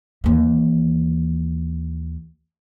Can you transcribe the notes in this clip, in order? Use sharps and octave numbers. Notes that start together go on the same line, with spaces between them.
D#2 E3